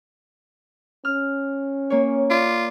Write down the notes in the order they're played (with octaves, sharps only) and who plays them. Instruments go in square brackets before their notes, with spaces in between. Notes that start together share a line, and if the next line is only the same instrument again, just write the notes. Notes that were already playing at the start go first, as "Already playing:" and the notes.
[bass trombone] C#4 [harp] F6
[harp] A#3 C#5
[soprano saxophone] F4 [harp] D5